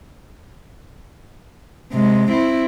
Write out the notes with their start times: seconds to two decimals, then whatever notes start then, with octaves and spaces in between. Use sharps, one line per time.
1.93 C3 G#3
2.31 C4 E4